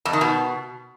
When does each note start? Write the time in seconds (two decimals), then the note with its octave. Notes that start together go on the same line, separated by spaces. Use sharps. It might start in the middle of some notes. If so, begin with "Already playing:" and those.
0.05 F2
0.13 D#3
0.21 B2